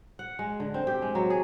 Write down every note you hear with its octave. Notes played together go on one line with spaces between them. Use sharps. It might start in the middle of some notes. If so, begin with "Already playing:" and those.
F#5
G#3
D3
C4
G4
G#3
F#3
G#4